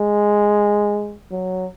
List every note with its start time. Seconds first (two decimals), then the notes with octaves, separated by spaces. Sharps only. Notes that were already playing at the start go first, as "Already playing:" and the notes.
Already playing: G#3
1.31 F#3